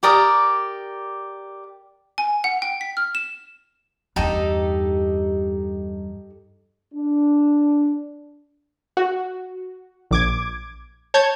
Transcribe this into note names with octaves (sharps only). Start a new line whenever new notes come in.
G4 A#4 D5 D#6
G#5
F#5
G5
B6
F6
E7
E2 G2 D#4 G4 A4
D4
F#4
A#1 D6 G#6
C#5 A5 G6 G#6